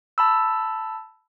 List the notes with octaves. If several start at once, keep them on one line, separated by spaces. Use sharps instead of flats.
A5 B5 E6